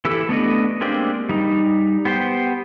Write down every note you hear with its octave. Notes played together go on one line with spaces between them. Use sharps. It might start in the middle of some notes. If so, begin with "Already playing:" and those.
E3 E4 G4 A4 E6
A3 B3 D4 D#5
G#3 A#3 C4 D4 G4
G3 D#4
B3 G4 C5 G5